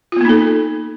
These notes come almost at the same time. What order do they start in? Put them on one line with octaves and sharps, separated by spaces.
F4 B3 A#3 D#4 A4